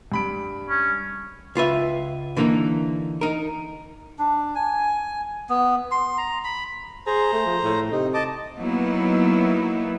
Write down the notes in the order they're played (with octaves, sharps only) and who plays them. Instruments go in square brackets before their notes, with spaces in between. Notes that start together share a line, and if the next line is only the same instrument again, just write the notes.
[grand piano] G2 B5 D7
[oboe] C#4
[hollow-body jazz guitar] C#2 F4 B4 E5
D3 E3 A#3 D4 D#4
D#4 A#4
[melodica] D4
G#5
B3
C6
A#5
B5
[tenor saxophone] G#4 [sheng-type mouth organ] C5 A#5
[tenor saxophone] A3
F3
A2
[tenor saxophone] C3 [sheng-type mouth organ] D#4
[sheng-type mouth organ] D#5 A5 D6
[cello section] F#3 A#3 B3 D#4 E4